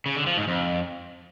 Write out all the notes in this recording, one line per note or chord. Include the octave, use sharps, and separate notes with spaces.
C#3
D3
F3
G#2
F2